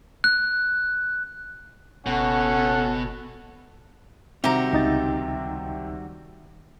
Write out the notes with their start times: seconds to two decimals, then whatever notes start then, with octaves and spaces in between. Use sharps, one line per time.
0.24 F#6
2.06 F#1 B2 C#4 A4 F#5
4.44 C3 D#3 G3 C4 F#4 G4 E5 A#5
4.73 C#2 D#4 A6